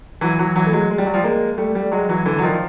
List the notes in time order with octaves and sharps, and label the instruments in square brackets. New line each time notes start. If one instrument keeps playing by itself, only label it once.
[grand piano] E3 F#3
E3 F#3
E3 F#3
A3
F#3 G#3
G#3
G3
F#3
F3 G3
G#3 A#3
G3 A3
G3 A3
F#3 G#3
E3 F#3
D3 E3
F#3
D#3 F3
F3